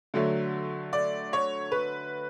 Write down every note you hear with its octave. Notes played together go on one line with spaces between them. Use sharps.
D3 F#3 A3
D5
C#5
B4